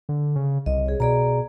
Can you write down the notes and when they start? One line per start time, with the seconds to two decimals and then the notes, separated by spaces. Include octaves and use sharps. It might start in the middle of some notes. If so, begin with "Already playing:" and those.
0.09 D3
0.36 C#3
0.66 C2 D#5
0.86 G#4 C#5
1.00 B2 G#4 D5 A#5